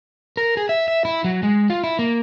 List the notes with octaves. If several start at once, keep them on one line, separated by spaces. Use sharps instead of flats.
A#4
G#4
E5
E5
E4
F#3
G#3
F4
E4
A#3